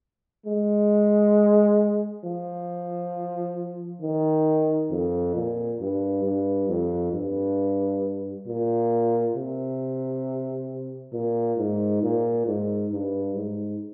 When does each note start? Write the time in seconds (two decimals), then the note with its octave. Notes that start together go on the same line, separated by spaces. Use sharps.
0.46 G#3
2.24 F3
4.02 D#3
4.91 F2
5.35 A#2
5.80 G2
6.24 G2
6.69 F2
7.13 G2
8.47 A#2
9.36 C3
11.13 A#2
11.58 G#2
12.03 A#2
12.47 G#2
12.92 G2
13.35 G#2